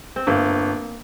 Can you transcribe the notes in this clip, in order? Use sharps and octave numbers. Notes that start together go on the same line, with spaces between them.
C4
G1 A#3